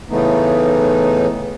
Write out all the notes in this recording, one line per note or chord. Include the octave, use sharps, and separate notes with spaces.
A2 C#3 E3 A3 B3 D#4